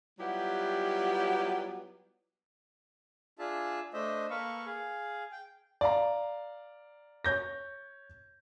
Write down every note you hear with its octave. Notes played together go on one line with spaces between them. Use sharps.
F#3 G3 B3 E4 F4 G4
D4 F4 G#4 E5 A5
A3 D4 C5 D#5 E5
A#3 A4 B4 F5 C#6
G#4 F5
G5
D5 F5 A#5
C#5 G6 A#6